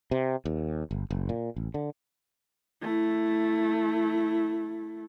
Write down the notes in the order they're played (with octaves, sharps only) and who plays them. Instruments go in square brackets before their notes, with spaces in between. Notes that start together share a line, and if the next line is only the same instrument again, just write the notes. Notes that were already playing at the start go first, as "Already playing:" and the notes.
[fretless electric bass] C3
D#2
G1
F#1
A#2
A1
D3
[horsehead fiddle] A3 E4